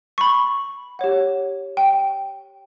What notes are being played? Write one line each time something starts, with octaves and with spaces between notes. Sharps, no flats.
C#6
B5
G4 C#5 F#5
G5